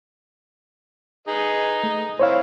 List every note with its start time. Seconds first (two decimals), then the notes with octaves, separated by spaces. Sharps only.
1.28 D#4 G#4 B4 D#5
1.84 A3
2.19 E3 C4 E4 C5 C#5 F5